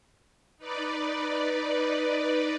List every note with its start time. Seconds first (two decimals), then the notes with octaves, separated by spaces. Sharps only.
0.58 D#4 B4 D5